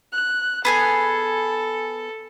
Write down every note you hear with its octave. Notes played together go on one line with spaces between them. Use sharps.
F#6
B3 G#4 A4 G#5